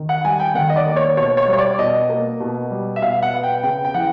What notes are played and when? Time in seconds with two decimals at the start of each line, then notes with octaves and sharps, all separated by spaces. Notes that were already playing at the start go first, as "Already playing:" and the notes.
Already playing: D#3
0.09 F#5
0.25 G3 G#5
0.40 G5
0.55 D#3 F#5
0.70 D#5
0.76 D5
0.86 A#3
0.96 C#5
1.17 B2 C#5
1.37 C#5
1.47 G3
1.53 C#5
1.58 D5
1.79 B2 D#5
2.10 A#3
2.40 B2
2.71 G3
2.96 E5
3.02 B2 F5
3.23 F#5
3.33 B3
3.43 G5
3.63 C#3 G5
3.85 G5
3.94 E3 F#5